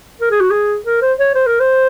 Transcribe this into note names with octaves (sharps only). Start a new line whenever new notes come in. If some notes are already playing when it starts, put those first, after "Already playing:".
A#4
G#4
F#4
G#4
A#4
C5
C#5
C5
A#4
C5